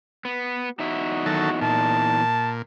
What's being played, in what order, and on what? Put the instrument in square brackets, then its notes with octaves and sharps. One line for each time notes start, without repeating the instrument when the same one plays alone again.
[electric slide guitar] B3
[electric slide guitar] E2 D#4 E5 [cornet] F#4
[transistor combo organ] D#3 F#3 A4
[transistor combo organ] A#2 [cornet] A5